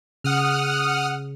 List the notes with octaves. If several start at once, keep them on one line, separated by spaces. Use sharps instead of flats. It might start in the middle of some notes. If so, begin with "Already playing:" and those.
C#3 F#5 D#6 F6